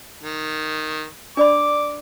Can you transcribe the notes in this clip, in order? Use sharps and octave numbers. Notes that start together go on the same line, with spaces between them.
D#3
D4 D5 B5 D6